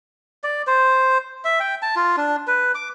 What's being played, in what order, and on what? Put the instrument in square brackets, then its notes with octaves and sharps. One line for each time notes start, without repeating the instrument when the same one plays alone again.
[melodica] D5
C5
E5
G5
A5
F4
D4
B4
D6